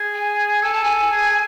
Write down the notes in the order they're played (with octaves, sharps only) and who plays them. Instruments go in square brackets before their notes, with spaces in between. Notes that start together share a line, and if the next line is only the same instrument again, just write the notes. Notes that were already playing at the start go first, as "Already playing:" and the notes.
Already playing: [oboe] G#4
[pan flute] G#5
[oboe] A4 [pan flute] G#5
[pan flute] A5
G#5
[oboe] G#4